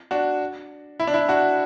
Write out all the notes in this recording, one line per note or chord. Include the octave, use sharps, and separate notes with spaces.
D4 F#4
E4
D4
E4
D4 F#4